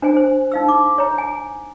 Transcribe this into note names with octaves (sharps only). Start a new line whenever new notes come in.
D4 C5 G#5
C5
D#4 F5 E6
D6
C#5 A#5
G#5